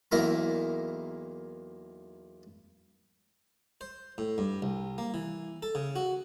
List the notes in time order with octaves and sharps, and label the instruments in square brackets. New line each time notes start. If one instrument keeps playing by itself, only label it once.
[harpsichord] B1 E2 A#3 E4 A#4 A#5
C5
A2
G2
C2
A#3
E3
A4
C#3
F#4